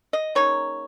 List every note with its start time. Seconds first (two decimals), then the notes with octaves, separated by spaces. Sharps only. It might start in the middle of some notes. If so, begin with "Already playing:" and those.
0.13 D#5
0.35 C#3 A#3 D#4 C#5